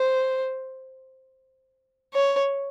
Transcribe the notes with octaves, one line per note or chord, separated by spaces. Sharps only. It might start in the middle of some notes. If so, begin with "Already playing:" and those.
Already playing: C5
C#5